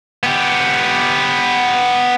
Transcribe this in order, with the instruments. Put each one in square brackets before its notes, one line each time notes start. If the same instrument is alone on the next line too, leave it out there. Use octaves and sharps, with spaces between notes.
[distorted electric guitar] B3 G4